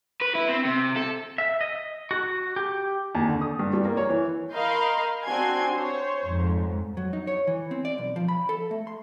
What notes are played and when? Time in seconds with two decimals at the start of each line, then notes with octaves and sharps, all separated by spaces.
0.21 B4
0.35 E4
0.49 C4
0.66 C3
0.97 A4
1.38 E5
1.61 D#5
2.11 F#4
2.56 G4
3.15 D#2
3.28 D3
3.41 D#6
3.59 G2
3.73 G3
3.85 A#3
3.97 C#5
4.09 E3
4.53 A#4 D#5 F5 B5 C6 G6
5.24 C4 D4 F#4 G#5 C6 G#6
5.74 C5 C#5
6.26 F2 G#2
6.97 F#3
7.13 D#4
7.27 C#5
7.47 E3
7.71 C4
7.85 D5
7.98 B1
8.16 F3
8.28 B5
8.49 A4
8.71 A3
8.87 C6